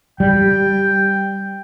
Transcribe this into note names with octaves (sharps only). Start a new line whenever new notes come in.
G3 G5